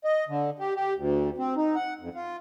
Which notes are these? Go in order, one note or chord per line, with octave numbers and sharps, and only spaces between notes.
D#5
D3
G4
G4
D2
C4
D#4
F#5
F2
F4